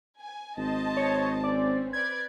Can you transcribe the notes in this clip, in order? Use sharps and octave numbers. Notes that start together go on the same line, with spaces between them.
G#5
G#1 C5 D#5 A5
C#5
C4 C#4 D5
B4 D5 G#6